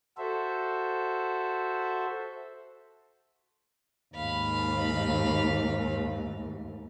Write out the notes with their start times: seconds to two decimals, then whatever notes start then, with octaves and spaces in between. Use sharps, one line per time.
0.18 F#4 A4 C5 E5
4.15 D#2 G#2 F5 B5